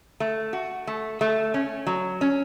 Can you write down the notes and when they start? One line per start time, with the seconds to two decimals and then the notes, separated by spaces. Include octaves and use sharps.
0.20 A3
0.53 F#4
0.87 A3
1.21 A3
1.54 C#4
1.87 F#3
2.21 C#4